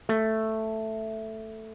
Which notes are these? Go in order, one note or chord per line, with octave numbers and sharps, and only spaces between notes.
A3